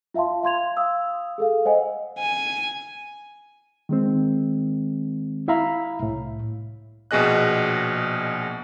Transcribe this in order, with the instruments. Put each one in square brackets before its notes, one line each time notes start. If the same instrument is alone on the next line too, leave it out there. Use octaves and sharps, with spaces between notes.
[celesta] F4 E5 F5 A5 C6
F5 C6 G#6 F7
F5 D#6 E6
G#4 A4 F5
C5 D#5 F#5 G#5
[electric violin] G#5
[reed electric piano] D#3 G#3 C4
E4 E5 F5 A#5 B5
C2 A2
[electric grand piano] A#1 B2 G#4 D#5 F#6